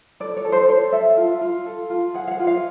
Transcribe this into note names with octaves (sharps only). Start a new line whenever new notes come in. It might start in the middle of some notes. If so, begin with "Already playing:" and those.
A4 D5
C#5
A4
C5
A4 C#5
A4 E5
F4
F4
A4
F4
G#4 F#5
F5
F#5
F4
F5